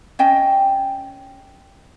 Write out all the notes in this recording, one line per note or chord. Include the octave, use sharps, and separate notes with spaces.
C#4 D#5 G5